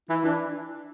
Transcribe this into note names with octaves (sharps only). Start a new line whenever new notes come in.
E3 E4
E3 D4